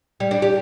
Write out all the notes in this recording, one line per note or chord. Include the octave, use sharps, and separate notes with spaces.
G3
D4
G4